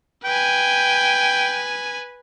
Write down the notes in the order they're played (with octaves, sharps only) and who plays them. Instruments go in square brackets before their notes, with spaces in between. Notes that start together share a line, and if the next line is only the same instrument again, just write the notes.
[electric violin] B4 G#5 [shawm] G5